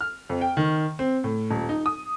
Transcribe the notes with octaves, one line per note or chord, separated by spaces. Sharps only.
F6
F2
G5
D#3
C4
A2
D#1
D#4
D#6